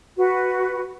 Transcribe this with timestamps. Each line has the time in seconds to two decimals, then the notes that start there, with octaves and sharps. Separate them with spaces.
0.17 F#4 B4